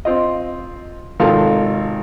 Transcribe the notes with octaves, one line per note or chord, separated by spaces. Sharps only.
C4 F4 D#5
G#1 C3 D#3 F4 A4 F5